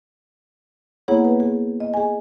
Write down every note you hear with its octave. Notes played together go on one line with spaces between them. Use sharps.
A#3 B3 E4 G#4 C#5 F#5
B4
G#4
D#5
G#4 G#5